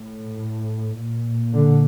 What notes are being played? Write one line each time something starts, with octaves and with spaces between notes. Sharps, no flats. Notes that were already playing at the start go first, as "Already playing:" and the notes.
Already playing: A2
A#2
D3